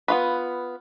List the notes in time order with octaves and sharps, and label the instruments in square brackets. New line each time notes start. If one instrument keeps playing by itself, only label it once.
[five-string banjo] B3 F4 B4